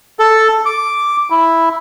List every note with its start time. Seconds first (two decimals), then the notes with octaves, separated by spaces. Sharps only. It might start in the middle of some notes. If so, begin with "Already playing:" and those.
0.19 A4
0.66 D6
1.30 E4